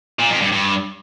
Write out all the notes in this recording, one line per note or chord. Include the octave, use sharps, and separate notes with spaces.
A#2
F2
G2
G2